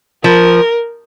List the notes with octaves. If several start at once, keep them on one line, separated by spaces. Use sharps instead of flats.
F3 A#4